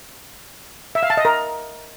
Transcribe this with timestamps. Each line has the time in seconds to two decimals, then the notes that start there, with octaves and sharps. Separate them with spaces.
0.95 E5
1.03 F5
1.10 A5
1.17 D#5
1.25 A#4